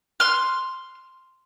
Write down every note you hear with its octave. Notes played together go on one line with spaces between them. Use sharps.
C6 F6